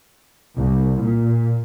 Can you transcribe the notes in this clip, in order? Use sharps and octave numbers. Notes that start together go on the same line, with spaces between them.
C2
A#2